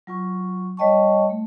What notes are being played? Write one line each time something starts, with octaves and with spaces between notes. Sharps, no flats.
F#3 F4 C#6
G3 C#5 D#5 G5 A5 C#6
A3